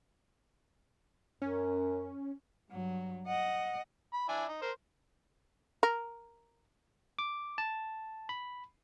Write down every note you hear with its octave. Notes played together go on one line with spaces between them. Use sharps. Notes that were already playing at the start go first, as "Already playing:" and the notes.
F#2 C#4
G2 F#3
D#5 F#5
B5
D4 E4 G#5
D#4
A#4 C5
A#4
D6
A5
B5